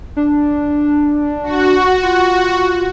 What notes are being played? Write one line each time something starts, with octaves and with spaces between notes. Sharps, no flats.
D4
F#4
F4